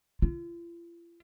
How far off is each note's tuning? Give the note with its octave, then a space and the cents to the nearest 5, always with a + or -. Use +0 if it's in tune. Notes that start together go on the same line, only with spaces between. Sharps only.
F4 -45